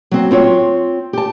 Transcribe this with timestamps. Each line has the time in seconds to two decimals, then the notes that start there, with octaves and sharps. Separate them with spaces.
0.11 F#3 C4
0.31 C4 F4 C#5
1.13 G4 A5